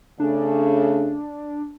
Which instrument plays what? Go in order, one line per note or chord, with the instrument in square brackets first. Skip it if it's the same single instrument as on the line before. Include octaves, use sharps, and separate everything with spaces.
[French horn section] C#3 A3 [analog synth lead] D4